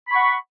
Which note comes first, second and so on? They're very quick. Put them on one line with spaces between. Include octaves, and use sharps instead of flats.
B5 C#6 F#5